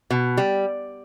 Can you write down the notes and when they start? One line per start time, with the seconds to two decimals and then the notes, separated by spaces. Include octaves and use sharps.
0.11 B2
0.37 G3